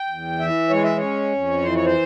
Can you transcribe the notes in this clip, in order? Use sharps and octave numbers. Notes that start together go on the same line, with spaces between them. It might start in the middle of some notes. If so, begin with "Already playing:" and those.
Already playing: G5
E2
E3 E5
G#3 C#5
E5
C#4 C#5
F2
E3 C5
C#5
C5